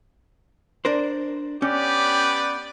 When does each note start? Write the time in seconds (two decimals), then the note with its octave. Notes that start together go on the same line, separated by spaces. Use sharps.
0.85 D4 A#4 C5
1.62 B3 C#4 G4 B4 D5